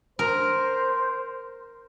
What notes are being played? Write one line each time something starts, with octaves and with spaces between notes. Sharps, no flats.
A#4 C5